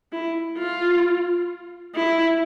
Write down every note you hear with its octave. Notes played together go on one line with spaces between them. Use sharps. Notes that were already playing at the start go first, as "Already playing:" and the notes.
E4
F4
E4